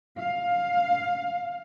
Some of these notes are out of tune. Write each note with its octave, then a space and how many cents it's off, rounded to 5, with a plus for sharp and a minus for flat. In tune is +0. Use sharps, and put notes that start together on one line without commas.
F5 +15